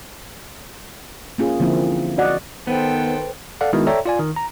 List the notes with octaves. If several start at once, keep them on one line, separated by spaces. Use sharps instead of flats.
A#3 C#4 F4 G#4
D3 F3 A#3 C4 E4
E3
F#4 D5 D#5 F#5
D#3 B3 A4 B4 C5 G5
A4 D5 F5 F#5
D#3 G#3 B3 E4 F#4
A4 C#5 D5 E5 G5 A#5
F4 D5 G#5
D#3
A#5